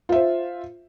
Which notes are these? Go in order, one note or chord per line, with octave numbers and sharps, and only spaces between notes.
F4 C5 E5